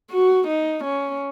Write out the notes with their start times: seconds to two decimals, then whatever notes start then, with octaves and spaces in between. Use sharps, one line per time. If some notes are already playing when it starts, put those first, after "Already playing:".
0.10 F#4
0.48 D#4
0.84 C#4